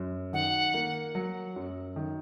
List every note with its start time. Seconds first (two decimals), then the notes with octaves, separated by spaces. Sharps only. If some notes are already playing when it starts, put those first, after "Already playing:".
Already playing: F#2
0.33 D#3 F#5
0.74 A#3
1.15 F#3
1.56 F#2
1.96 D#3